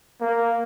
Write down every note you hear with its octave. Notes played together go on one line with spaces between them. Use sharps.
A#3